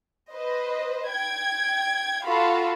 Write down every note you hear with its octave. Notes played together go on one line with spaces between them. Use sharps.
B4 C5 D#5
G5 G#6
F4 F#4 A4 F5 B5